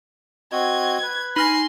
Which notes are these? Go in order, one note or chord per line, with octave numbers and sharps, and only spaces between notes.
C4 F#4 D#5 G#6
B4
D#4 G#5 B5 C6 F6 A#6